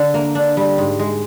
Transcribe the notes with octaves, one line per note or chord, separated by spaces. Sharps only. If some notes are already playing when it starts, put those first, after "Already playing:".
Already playing: D3
A#3
D4
G3
G#2
G#3